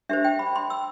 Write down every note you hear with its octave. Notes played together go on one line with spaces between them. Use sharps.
D4 G4 C5 E5
G5
B5
C6
E6